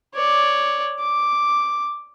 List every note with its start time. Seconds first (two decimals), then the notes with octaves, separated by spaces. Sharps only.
0.14 C#5 D5
0.99 D6